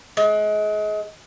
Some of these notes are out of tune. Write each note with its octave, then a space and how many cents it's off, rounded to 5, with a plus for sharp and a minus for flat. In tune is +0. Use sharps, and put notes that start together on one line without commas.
G#3 +30